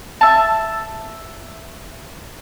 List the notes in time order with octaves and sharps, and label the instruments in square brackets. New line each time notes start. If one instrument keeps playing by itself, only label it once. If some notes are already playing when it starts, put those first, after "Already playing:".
[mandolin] E5 A5